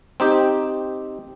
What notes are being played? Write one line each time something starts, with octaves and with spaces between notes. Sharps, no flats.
C4 D#4 G4